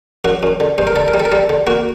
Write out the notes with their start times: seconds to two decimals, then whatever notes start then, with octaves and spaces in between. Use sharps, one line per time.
0.24 F#2 F#4
0.43 F#2
0.60 D3
0.78 G2 C5
0.87 A#4
0.96 D3 A4
1.08 A#4
1.14 G3
1.20 A4
1.25 A#4
1.32 G3 A4
1.49 D3
1.67 A#3 F#4